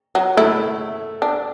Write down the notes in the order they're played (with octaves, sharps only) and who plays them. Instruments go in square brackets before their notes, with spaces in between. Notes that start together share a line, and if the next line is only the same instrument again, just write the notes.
[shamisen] F#3
[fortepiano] A3 [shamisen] E4
[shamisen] D4